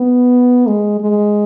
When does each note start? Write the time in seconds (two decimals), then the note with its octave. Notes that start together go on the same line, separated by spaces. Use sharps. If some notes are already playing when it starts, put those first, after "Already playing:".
Already playing: B3
0.67 G#3
1.01 G#3